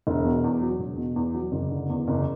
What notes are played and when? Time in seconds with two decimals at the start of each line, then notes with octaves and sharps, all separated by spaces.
0.07 E1
0.25 B2
0.44 E2
0.62 F#3
0.79 E1
0.98 B2
1.16 E2
1.34 F#3
1.52 F#1
1.71 D3
1.89 E2
2.08 F#1